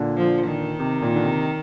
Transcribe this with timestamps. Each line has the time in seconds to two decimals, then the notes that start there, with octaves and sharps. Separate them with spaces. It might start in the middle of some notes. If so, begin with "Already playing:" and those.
Already playing: A#2 D3
0.17 F3
0.48 D#3
0.80 C3
1.02 A#2
1.16 D3
1.25 C3